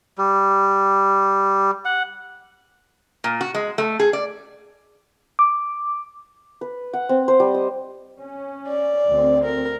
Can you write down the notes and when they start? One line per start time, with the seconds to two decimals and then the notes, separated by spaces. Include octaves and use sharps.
0.18 G3
1.85 F#5
3.24 A#2
3.41 F#4
3.55 G#3
3.78 A3
3.99 G#4
4.13 D5
5.39 D6
6.61 B4
6.93 F#5
7.09 C4
7.28 C5
7.40 G3
7.54 D#5
8.19 C#4
8.67 D5
9.08 D2 C4
9.45 A#4